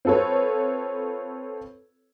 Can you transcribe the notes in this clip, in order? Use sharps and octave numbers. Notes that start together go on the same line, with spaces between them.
C4 F4 A4 B4 C#5